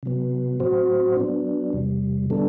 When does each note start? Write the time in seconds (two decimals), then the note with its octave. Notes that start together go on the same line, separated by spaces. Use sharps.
0.03 C3 F#3 B3
0.60 A2 F#3 C4 F#4 C5
1.16 F#3 B3 D4
1.73 E2 C3 G3
2.30 D3 G3 B3 D4 A4